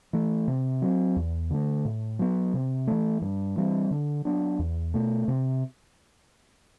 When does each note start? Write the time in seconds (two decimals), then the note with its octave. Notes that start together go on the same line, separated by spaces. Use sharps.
0.13 E3 A3
0.48 C3
0.82 F#3 C4
1.16 E2
1.50 D3 A3
1.85 A2
2.19 F#3 B3
2.54 C3
2.87 E3 A3
3.22 G2
3.57 E3 G3 C4
3.91 D3
4.25 F#3 B3 D4
4.59 E2
4.94 B2 A3
5.28 C3